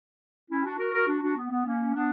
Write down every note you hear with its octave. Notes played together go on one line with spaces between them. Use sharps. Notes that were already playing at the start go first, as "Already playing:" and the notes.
C#4 E4
D4 F#4
F#4 A#4
F#4 A#4
D4 F#4
D4 F#4
B3
B3
A#3 C#4
B3 D4